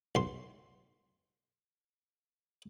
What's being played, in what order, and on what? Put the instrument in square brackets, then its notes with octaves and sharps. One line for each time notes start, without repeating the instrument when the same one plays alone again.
[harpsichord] B1 C6